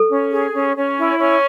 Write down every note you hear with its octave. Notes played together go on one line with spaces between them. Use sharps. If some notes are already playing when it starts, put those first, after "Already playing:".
Already playing: A4
C#4
G#4
C#4
C#4
E4
C#4